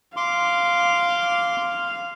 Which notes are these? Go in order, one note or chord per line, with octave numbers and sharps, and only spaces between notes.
F5 C6 D6